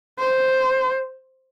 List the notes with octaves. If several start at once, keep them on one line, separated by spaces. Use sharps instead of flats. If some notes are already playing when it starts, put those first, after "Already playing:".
C5